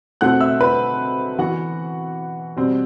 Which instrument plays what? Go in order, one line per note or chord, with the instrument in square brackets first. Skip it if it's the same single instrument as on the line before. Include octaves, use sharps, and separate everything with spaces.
[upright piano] B2 A3 C4 F#5 F#6
E5 E6
B4 B5
E3 B3 F#4 F#5
B2 G3 C4